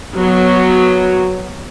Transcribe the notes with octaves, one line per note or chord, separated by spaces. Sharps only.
F#3 B3